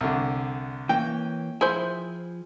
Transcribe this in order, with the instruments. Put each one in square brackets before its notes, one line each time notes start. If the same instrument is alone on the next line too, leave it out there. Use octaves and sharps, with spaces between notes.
[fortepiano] C2 D3
[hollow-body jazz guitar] E3 A#3 C#4 [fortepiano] G5
[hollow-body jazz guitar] F3 G#4 [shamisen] E4 C5